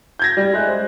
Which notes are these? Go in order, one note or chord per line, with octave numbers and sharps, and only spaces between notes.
G6 G#6 A#6
G3
G#3 E5 F#6
C5